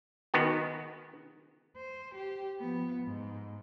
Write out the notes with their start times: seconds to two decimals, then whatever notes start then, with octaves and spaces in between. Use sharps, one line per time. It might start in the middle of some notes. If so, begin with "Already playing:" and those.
0.34 D#3 B3 F#4
1.77 C5
2.15 G4
2.60 F3 B3
3.03 G#2